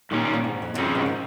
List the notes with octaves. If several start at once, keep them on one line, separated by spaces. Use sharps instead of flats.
G2 A#2 D#3 G3 C#4 G4
A#2
G#2
F2
F2
G2 C#3 F3 C4
G#2
D#3